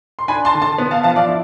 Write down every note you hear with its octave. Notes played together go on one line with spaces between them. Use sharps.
C6
D4 G#5 B5
A5 C6
D3
A5 C6
B3
F5 A5
F3 F5 A5
D5 F5
E4